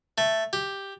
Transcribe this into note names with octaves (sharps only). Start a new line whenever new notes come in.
A3
G4